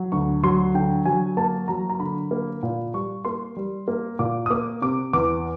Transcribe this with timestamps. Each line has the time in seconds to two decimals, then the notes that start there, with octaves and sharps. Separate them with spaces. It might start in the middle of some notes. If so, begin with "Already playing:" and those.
Already playing: F#3
0.12 D2 C#6
0.43 F#3 C6
0.74 D3 G5
1.06 F#3 G#5
1.37 A#3 A5
1.68 F#3 A#5
1.89 A#5
2.00 D3 B5
2.31 A#3
2.63 A#2
2.94 G3 C#6
3.25 A#3 C6
3.57 G3
3.88 A#3
4.19 A#2 D6
4.46 D#6
4.50 A#3 D6
4.82 C3 D6
5.13 E2 D6